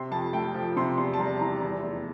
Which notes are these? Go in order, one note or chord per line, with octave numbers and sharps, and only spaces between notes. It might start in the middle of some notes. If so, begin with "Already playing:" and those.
Already playing: C3 C6
F2 A5
A3 G5
F3
C3 C6
E2 C6
A5
G3 A#5
E3 A#5
E2
F1